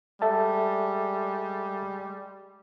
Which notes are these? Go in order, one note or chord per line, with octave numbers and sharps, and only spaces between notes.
G3 G#3 A4 E5 A5